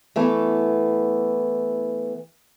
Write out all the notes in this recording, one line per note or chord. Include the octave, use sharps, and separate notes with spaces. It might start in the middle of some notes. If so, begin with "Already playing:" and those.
E3 A3 B3